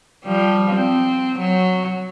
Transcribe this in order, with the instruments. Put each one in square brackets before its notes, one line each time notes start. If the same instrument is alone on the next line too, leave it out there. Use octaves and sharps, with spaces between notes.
[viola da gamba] F3 G3
C4
F#3